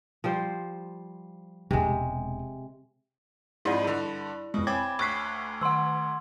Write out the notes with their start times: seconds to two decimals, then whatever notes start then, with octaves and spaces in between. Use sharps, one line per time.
0.24 F3 G3 C5
1.71 E1 C3 G#3 D#4
3.65 F2 G#2 E4 D5 B5 D#7
3.84 G2 D3
4.54 F2 B2 G#3
4.67 C4 C#5 G5 G#5 B5 D6 G#6
4.99 D2 C#6 F#6 B6 C7
5.61 D#3 F#5 C6 E6